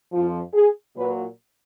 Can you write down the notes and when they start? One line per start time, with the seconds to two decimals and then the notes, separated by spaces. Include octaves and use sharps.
0.12 F2 F3 F4
0.54 G#4
0.95 A#2 F#3 B4